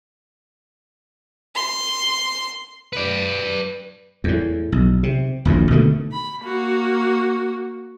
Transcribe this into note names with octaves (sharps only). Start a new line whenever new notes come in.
C6
B4 D5
E2 A2
B1
C3
D#1 A#1 F#2 A2
B2 D3 D#3 A3
B5
A#3 F#4